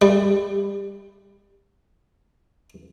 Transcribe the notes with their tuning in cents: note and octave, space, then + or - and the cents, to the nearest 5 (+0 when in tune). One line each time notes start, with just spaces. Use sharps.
G3 +20